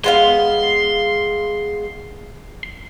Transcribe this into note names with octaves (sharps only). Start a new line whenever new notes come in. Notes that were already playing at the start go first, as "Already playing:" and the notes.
G#3 B3 F5 C6